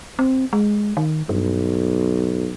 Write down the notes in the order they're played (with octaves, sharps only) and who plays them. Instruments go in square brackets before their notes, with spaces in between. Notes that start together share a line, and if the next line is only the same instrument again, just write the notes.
[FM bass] C4
G#3
D#3
[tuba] B1 [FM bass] G2